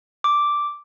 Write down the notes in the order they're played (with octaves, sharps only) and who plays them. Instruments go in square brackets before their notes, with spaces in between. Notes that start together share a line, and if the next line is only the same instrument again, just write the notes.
[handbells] D6